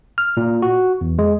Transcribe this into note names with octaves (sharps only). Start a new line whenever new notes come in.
F6
A#2
F#4
E2
G#3